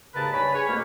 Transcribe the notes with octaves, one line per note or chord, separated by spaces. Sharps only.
D#2 G#2 C#3 A#4 B4 A5
G2 C#5 G#5 B5
G#4 B4 C#5
F2 B2 A3 A#3